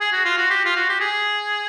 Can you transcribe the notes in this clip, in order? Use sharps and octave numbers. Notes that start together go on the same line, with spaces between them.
G#4
F#4
F4
F#4
G4
F4
F#4
G4
G#4